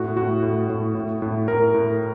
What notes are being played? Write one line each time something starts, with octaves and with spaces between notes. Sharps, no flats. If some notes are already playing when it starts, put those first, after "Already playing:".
Already playing: A2 F#4
A2 F#4
A2
A2
A2
A2
A2 A#4
A2